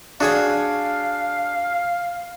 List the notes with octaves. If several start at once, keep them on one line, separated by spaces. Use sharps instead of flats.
D4 F#4 G#4 C#5 F5